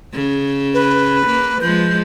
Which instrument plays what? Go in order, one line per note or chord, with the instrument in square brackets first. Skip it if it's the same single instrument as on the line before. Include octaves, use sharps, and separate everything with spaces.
[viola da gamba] C#3
[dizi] B4
[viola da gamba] A#3
[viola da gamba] F3 G#3 [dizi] G6